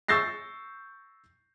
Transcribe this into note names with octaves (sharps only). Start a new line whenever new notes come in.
C#6 E6 G6 A6 A#6 C7